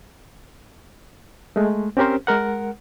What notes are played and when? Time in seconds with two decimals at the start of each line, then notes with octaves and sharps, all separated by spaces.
1.56 G#3 A3
1.97 C4 C#4 G4 A#4 C5
2.27 G#3 A#4 F#5